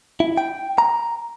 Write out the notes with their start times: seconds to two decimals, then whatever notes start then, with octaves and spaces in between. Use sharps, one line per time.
0.20 E4
0.37 G5
0.78 A#5